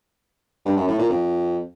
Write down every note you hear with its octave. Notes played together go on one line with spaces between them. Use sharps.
G2
F#2
A2
A#2
F2